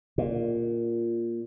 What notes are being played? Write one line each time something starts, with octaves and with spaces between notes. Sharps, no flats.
A#2